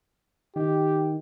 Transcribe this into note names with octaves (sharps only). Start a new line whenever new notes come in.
D#3 G4